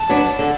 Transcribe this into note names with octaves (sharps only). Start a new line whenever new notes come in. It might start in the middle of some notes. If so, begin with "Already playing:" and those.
Already playing: A5
F#3 B3 D4
D3